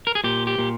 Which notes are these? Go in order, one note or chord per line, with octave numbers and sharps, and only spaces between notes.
A#4
G#4
A#2 G4
G4
A#2